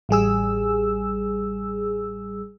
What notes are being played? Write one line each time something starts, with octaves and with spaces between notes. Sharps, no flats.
A1 G3 G#4 E6